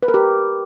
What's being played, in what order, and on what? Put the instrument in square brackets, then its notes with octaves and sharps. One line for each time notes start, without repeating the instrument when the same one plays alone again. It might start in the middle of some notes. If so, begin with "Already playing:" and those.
[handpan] B4
A#4
G4